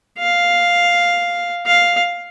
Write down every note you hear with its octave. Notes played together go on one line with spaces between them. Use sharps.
F5
F5